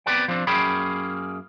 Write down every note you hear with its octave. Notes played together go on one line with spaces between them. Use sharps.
B3 C4 G4 B4 D5 G5
F3 C4 D4
F#2 A#3 C#4 G#4 G5 B5